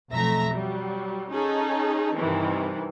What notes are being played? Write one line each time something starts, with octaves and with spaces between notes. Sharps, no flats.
B1 F2 A3 E5 A#5 A#6
F#3 G3
C#4 D#4 G#4 A4
G2 C3 D#3 E3